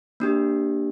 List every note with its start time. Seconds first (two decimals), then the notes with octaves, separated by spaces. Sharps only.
0.20 A#3 D4 G4